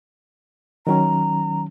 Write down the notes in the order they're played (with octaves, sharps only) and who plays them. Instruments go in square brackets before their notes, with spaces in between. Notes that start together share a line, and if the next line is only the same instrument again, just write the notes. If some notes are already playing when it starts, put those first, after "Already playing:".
[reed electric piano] D#3 F#3 C#4 [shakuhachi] A#5